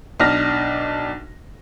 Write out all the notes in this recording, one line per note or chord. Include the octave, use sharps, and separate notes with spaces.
B1 D4 F6 A#6